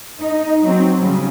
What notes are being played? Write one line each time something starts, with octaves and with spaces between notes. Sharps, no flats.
D#4
F#3 C4
C#3 G3